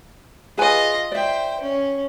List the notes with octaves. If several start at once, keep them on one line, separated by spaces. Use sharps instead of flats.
F4 G#4 B4 D#5 G#5
C5 D5 E5 G5
C#4